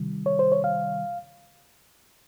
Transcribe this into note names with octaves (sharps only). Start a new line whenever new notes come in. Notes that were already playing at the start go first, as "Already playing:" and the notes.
Already playing: C3 D#3 G3
C#5
C5
C#5
F5